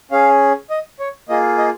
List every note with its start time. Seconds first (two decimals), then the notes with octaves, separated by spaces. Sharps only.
0.11 C#4 G#4 F5
0.70 D#5
0.99 C#5
1.29 A#3 F4 G#4 D#5
1.58 D#5